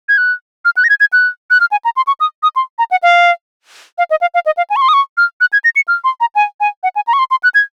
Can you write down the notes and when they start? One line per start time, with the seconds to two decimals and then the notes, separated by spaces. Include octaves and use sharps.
0.09 G#6
0.18 F#6
0.65 F6
0.77 F#6
0.84 A#6
0.89 G#6
1.00 G#6
1.13 F#6
1.50 F#6
1.60 F6
1.72 G#5
1.85 A#5
1.97 C6
2.07 C#6
2.20 D#6
2.43 D#6
2.56 C6
2.79 A#5
2.91 F#5
3.03 F5
3.98 F5
4.11 D#5
4.21 F5
4.34 F5
4.46 D#5
4.57 F5
4.70 G#5
4.76 C#6
4.82 C6
4.89 D#6
4.94 C#6
5.17 F6
5.41 F#6
5.53 G#6
5.64 A#6
5.76 C#7
5.88 F6
6.04 C6
6.21 A#5
6.35 G#5
6.60 G#5
6.83 F#5
6.96 G#5
7.07 A#5
7.13 C#6
7.19 C6
7.31 C6
7.43 F#6
7.55 G#6